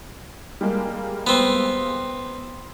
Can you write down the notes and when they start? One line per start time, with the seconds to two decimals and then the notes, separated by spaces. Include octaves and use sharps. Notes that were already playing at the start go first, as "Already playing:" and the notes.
0.61 G3 G#3 A#3
1.27 B3 C4